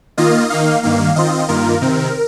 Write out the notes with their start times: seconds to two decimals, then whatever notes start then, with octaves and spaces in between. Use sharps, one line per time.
0.18 D#3 A#3 F4 D#5
0.50 D#3 A#3 D#4 F5
0.83 G2 D#3 A#3 F5
1.16 D#3 C4 F4 D#5
1.48 G2 D#3 A#3 F4 A#4
1.81 C3 D#3 C4